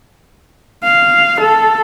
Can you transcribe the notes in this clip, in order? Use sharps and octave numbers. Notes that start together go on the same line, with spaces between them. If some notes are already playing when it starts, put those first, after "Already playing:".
F5
A4